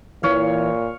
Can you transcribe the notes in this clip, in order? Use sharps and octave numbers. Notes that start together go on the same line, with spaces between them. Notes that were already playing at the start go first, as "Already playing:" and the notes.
A#2 E3 C#5 F5